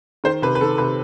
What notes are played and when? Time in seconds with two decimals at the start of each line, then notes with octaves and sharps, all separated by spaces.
0.24 D#3 C5
0.42 C3 B4
0.55 B4
0.61 D#3 A4
0.78 C3 B4